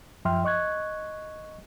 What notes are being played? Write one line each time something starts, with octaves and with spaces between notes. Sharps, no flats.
F#2 F3 E5 G5 C6 F6
D#5 C#6 F#6 G#6